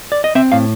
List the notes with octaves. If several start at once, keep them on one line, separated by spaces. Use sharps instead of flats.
D5
D#5
C4 E5
A2 F5